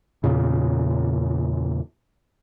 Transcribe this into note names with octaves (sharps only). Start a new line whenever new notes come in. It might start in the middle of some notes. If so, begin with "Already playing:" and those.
E2 A#2 C#3